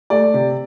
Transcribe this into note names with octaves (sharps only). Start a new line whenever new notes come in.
A3 D5
C3